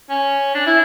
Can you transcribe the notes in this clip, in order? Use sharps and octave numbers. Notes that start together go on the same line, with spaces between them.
C#4
D4
E4